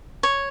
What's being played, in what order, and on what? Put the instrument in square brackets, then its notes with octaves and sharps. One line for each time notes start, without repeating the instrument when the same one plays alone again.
[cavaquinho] C#5